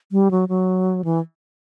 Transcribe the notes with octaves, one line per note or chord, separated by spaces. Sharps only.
G3
F#3
F#3
E3